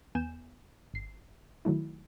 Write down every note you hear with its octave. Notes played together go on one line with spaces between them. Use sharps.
E2 B3 G#5 G6 E7
G#1 C7
D#3 F#3 A3 E4